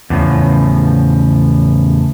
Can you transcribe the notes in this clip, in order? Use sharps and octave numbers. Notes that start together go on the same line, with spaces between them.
E2 A2 C#3 F3